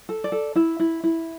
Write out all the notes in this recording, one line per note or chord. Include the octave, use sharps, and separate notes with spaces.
A4
D5
A4
E4 E5
E4
E4